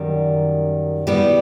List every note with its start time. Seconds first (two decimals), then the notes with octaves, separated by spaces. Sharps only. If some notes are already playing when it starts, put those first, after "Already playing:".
Already playing: F#2 D#3 G3
1.07 G3 B3 E4 G4